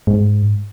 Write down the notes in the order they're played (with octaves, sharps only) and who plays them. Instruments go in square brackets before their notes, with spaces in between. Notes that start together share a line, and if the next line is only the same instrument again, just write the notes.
[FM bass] G#2